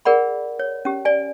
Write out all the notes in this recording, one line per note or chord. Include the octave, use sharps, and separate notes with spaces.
G#4 A#4 D5 F#5 B5
C#5
C#4 G4
D5 G#5